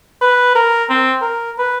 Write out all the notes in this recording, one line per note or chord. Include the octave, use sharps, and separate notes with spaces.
B4
A#4
C4
A#4
B4